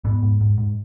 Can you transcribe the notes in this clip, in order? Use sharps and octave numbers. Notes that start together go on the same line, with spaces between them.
G#2 B3
G#2
G#2
G#2